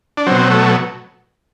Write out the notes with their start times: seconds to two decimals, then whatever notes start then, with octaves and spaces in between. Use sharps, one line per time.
0.17 D4
0.27 B2 F#3 C4
0.50 A3